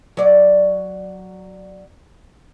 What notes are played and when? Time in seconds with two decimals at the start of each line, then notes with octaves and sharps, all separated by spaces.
0.17 F#3 D5